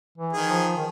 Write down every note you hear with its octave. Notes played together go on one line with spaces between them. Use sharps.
E3
D#3 G#4
F3
D#3